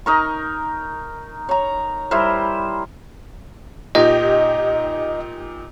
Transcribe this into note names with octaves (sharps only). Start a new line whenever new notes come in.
D#4 A#4 C#6
C#5 A#5
G3 E4 A#4 C5
A#2 D#4 G4 D#5